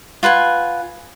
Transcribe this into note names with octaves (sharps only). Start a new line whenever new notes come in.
F4 B4 F#5 G#5